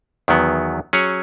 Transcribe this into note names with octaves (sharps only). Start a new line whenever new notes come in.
E2 D#3 F#3 B3
F#3 C#4 G#4 C#5